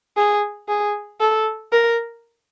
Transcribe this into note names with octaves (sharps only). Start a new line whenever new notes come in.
G#4
G#4
A4
A#4